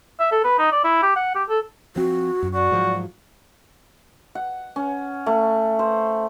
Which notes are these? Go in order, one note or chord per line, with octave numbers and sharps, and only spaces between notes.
E5
A4
B4
D#4
D5
E4
G4
F#5
G4
A4
F3 C4 F#4
F#2
F#4 D5
G#2 F3 F#3
F#5
C#4
A3
C5